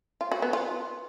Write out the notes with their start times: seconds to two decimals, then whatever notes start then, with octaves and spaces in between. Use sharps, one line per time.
0.21 F4
0.32 F#4
0.42 B3
0.53 F4